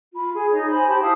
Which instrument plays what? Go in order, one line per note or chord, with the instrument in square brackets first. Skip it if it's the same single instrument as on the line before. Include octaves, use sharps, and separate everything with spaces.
[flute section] F4 B5
G#4
D#4 C#5 D#5
C5 G#5 B5
G4 A5 B5 C6
E4 F5 A5 D#6